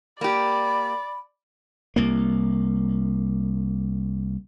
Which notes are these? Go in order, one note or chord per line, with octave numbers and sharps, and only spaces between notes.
A#3 G4 D5 B5
C2 A#3